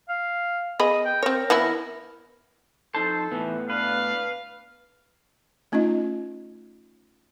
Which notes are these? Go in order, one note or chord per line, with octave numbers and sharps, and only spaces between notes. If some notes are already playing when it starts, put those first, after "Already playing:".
F5
B3 G#4 D#5 B5
G5
C4 A#4 C#5
E3 B3 E4
F2 D#4 A4 C5 A5
A2 E3 B3
D4 B4 F5
A3 C#4 D#4 F4 D#5